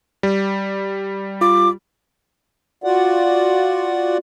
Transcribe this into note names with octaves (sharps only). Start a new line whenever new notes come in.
G3
F4 D6
F4 F#4 D5 F#5